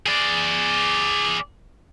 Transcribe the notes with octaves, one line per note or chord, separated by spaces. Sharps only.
G#4 D5